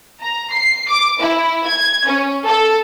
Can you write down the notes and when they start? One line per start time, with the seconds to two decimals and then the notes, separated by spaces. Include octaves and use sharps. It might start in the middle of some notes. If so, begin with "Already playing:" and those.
0.21 A#5
0.52 C7
0.88 D6
1.20 E4
1.66 G#6
2.07 C#4
2.46 A4